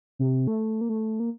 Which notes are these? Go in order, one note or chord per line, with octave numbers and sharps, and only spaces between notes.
C3
A3
A#3
A3
A#3